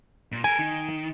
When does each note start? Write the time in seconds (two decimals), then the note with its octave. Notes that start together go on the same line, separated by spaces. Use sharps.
0.32 A#2
0.44 A4 A#4 G#5
0.59 D#3